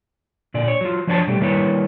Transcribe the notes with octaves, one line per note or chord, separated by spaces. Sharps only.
A#2 D3 D5
C#5
F#3 F4
F3 F#3 D4 C5 C#5 A5
B2 G3 A3 G4
D#3 G3 A#3 E4 B4 C#5